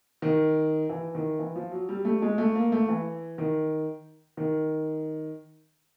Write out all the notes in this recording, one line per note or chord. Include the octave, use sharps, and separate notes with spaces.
D#3
E3
D#3
E3
F3
F#3
G3
A3
G#3
A3
A#3
A3
E3
D#3
D#3